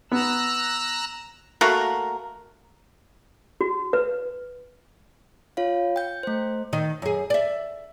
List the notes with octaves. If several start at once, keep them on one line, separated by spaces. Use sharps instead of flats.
B3 A#5 E6 F#6
A3 A#3 F#4 A#4
F#4
B4
F4 C#5 F5
G5 G6
A3 C5
D#3
F#2 G#4
D5 E5